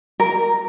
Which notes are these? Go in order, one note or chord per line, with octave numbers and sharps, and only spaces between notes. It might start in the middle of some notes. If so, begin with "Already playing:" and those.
A#4